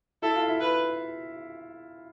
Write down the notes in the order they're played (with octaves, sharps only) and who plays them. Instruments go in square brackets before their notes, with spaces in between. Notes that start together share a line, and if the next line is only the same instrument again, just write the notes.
[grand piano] E4 E5 [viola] A4
[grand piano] F4 F5
E4 E5
[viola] B4